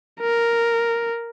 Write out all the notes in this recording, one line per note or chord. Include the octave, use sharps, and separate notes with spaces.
A#4